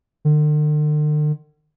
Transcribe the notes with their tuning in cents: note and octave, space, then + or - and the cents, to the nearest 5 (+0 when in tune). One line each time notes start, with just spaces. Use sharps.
D3 +45